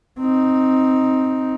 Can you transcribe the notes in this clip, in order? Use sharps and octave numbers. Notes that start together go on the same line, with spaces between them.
C4 D#4